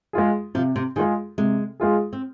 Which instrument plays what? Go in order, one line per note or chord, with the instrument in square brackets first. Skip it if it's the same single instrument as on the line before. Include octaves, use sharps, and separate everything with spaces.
[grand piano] G#3 F4 G#4
[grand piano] C3 [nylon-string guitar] F3
[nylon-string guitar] C3
[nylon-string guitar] D#3 [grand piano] G#3 F4 G#4
[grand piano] C3 [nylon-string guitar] G#3
[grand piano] G#3 F4 G#4
[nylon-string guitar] C4